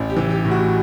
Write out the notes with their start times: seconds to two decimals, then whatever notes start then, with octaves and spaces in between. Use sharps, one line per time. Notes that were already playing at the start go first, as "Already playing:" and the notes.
Already playing: A1
0.10 G4
0.17 E3
0.30 G4
0.45 A2
0.51 F#4